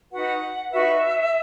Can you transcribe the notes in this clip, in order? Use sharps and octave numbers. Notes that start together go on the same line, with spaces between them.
D#4 F#4 B4 F#5
D#4 F#4 B4 E5